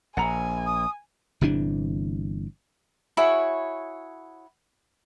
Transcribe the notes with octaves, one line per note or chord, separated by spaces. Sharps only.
A#1 F#5 G#5 A#5 B5
D#6
G1 C3 E3 D4
E4 F#4 G#4 C#5